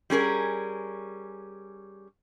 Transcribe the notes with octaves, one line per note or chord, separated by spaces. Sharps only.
G3 C#4 G#4 A#4